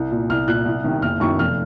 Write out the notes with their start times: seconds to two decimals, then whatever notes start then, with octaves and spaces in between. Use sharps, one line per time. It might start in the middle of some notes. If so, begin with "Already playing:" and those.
Already playing: C2
0.11 A#2
0.29 C2 F6
0.47 A#2 F#6
0.66 C2
0.84 C3 D#3
1.02 F#1 F6
1.20 F#2 D#3 C#6
1.39 F1 F6